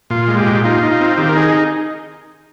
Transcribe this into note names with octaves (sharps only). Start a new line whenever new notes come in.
A#2 F4
G#3
G4
A#2
D#4 F4
D#4
F4
C4
D#3 G4
A#4
D#4 G#4